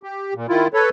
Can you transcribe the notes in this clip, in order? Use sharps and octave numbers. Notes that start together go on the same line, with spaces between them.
G4
A#2
D#3 E4 F4
A4 B4 C#5